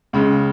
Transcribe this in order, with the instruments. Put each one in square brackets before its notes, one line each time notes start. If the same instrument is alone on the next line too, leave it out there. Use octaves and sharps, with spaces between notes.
[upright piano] C#2 C#3 G#3